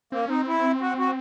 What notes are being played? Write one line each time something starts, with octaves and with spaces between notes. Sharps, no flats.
A#3 C4
C#4
C4 D#4
E4
F#4
F#4